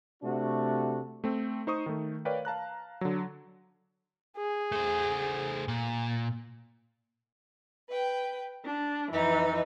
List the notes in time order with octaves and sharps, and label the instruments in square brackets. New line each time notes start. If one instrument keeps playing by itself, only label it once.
[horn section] C3 A3 D4 F#4
[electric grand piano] A3 C4
D#4 C5 C#6 D#6
D#3 A3
A#4 B4 C#5 D5 F5 G5
F5 A5 A#5 F#6
D3 F#3
[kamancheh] G#4
[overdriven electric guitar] A3 C5
A#2
[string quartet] B4 G5
D4
F2 E3 D#4